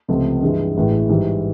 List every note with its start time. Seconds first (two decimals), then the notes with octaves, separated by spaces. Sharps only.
0.08 C#2 C3 F3 A3
0.42 G2 E3 G#3
0.76 A1 A2 E3 G#3
1.09 G#2 E3 G3